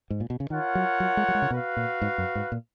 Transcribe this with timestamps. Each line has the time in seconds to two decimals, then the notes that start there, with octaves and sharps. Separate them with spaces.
0.10 G#2
0.20 A#2
0.30 B2
0.40 C#3
0.50 D#3 F4 A#4 C#5 F#5
0.75 F#3
1.00 F#3
1.17 G#3
1.28 F#3
1.35 G#3
1.42 C#3
1.51 B2 F#4 B4 F5
1.77 A#2
2.02 G#2
2.18 F#2
2.35 G#2
2.52 A#2